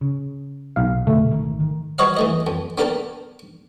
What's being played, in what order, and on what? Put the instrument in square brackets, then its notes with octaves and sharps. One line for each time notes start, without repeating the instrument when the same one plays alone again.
[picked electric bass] C#3
[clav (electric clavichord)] B1 F5
[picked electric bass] F1 B2 D3 [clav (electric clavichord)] A3
[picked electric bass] G#1 B2 D#3
D#3
[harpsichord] F#4 B4 C#5 D#5 F5
E3 A3 D#5
F2
B3 D4 A4 A#4 G5 A5